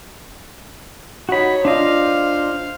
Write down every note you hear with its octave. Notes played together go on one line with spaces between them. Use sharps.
D#4 F#4 C#5 B5
D4 F4 C5 D#5 F5